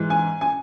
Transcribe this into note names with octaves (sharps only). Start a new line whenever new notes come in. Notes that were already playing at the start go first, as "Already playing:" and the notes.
Already playing: G#2 E3
G#5
G#5